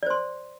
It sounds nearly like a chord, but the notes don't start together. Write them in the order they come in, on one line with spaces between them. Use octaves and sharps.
D5 C5 C6